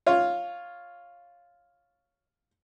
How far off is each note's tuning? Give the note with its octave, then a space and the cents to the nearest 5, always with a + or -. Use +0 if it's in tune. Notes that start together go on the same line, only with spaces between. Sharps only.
F4 +0 C#5 +0